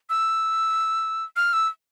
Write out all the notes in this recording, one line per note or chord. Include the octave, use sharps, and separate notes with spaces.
E6
F6
E6